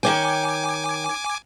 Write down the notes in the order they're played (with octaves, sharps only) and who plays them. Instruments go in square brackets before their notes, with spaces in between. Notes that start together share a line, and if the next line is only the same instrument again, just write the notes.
[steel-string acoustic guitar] D#3 C#5 G5 [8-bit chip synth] G#5 D6